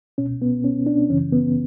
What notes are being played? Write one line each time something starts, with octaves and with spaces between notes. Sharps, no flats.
C#2 B2 C#4
B3
C#4
D4
F#2 C#3 E3 C#4
B3